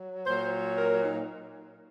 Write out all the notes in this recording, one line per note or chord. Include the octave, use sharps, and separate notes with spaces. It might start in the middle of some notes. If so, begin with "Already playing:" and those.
Already playing: F#3
A#2 F#3 C5
A#4
D#4